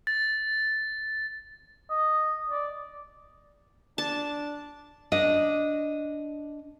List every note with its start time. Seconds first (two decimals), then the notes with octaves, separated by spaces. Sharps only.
0.07 A6
1.90 D#5
2.50 D5
3.98 D4 A5
5.12 D4 D#5